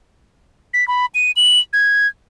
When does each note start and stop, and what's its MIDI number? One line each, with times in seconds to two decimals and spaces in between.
0.74 0.87 95
0.88 1.06 83
1.15 1.31 99
1.36 1.59 102
1.73 2.07 92